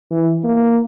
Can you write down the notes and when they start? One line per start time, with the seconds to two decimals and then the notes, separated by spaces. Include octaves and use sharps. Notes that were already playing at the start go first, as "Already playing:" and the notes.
0.11 E3
0.44 A#3